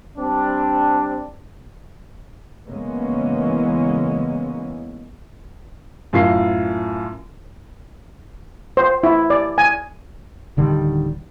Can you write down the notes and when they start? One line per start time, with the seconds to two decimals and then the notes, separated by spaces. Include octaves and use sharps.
0.18 G3 C4 D4
2.69 C#3 E3 G#3 A#3 B3 C#4
6.13 F#2 A2 F4 A#4 C7
8.77 C5
9.04 E4
9.30 D5
9.58 G#5
10.57 D1 D3 D#3 G3